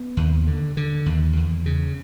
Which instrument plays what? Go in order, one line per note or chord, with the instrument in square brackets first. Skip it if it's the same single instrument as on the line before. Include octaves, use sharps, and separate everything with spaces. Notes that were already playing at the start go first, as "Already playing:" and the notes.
Already playing: [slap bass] B3
D#2
D3
D3
D#2
E2
C#3